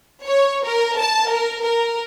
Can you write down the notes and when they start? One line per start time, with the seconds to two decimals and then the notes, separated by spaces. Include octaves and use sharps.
0.25 C#5
0.64 A#4
0.98 A5
1.29 A#4
1.62 A#4